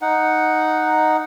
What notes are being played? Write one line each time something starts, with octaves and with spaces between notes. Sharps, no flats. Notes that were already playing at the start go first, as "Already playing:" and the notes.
D#4 F#5